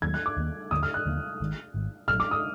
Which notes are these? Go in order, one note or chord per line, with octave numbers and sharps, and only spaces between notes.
D#2 D#3 F#3 A#3 G#6
F#6
D6
D#2 D#3 F#3 A#3
D#2 D3 F3 A#3 D#6
F6
F#6
D#2 D3 F3 A#3
G#1 G#2 D#3
G#1 G#2 D#3
A#1 A#2 F#3 F6
D6
D#6